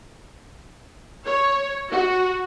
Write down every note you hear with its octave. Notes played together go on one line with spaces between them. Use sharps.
C#5
F#4